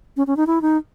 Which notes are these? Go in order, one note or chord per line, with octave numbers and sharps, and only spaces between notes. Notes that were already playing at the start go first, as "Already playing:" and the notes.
C#4
C#4
D#4
E4
D#4